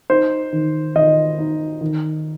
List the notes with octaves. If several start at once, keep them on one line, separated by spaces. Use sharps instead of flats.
D#4 C5
D#3
D#3 D#5
D#4
D#3